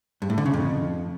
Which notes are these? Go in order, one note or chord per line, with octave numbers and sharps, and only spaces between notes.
G2
A2
D3
C#3
F2